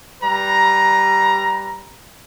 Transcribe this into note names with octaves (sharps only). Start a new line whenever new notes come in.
G3 B4 A#5